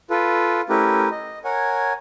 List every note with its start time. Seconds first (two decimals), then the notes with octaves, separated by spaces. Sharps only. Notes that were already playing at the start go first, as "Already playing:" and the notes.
0.10 F4 A4 B4
0.69 A3 C#4 E4 G4 A#4 B4
1.11 D#5
1.44 A#4 C#5 F#5 G#5